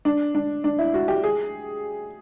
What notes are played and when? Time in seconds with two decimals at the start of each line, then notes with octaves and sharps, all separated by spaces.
0.05 D4
0.35 D4
0.64 D4
0.79 E4
0.94 F#4
1.08 G4
1.24 G#4